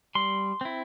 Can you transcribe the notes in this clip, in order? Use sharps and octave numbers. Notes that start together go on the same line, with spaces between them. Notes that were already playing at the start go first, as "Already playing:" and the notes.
G3 C6
C4 E4